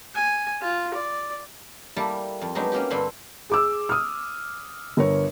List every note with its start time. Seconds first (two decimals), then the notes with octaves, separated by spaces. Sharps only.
0.15 G#5
0.62 F4
0.94 D5
1.96 G3 A#3 E4 G4 A4
2.41 F2
2.55 F#3 G#3 B3 D4 D#4 G4
2.72 A#3 C#4 F#4 G4
2.90 G2 D3 G3 C4 B5 C6
3.50 G#4 D6 E6
3.89 D#6 F6
4.97 G1 A#4 C#5